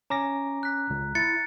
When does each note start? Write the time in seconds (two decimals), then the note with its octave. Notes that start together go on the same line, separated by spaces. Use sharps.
0.10 C#4 A#5 D6 A#6
0.63 F#6 B6
0.90 C#2
1.15 E4 A6 C#7